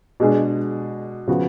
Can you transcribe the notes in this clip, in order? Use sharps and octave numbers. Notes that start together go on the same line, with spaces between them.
B2 G#3 D4 G#4
C#3 F3 B3 F#4